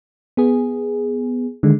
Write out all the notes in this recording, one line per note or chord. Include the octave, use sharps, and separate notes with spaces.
B3 G#4
D3 D#3 G#3